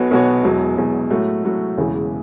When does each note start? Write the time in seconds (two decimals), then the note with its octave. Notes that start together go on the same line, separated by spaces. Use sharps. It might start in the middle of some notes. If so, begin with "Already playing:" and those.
Already playing: B1 B2 B3 F#4 C#5
0.11 B1 B2 B3 F#4 C#5
0.43 E1 E2 B2 F#3
0.77 E1 E2 B2 F#3
1.10 A2 F#3 A3 F#4
1.43 A2 F#3 A3 F#4
1.77 E1 E2 C#3 E3